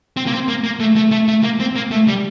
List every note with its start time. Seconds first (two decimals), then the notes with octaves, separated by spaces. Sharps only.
0.17 C4
0.27 A#3
0.32 C4
0.48 A#3
0.64 A#3
0.80 A3
0.96 A3
1.11 A3
1.28 A3
1.43 A#3
1.60 C4
1.76 A#3
1.91 A3
2.08 G3